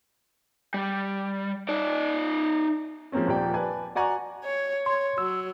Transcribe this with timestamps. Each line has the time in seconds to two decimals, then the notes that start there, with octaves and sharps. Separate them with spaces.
0.74 G3
1.69 D#4 D5
3.12 F3 G#3 A#3 C4 C#4
3.27 D#1 F3 A#3 G4 D5 G5
3.54 B4 D5 G#5 A5
3.95 F#4 D5 F#5 G#5 A#5 C#6
4.44 C#5
4.86 C#5 C6
5.18 F#3 E6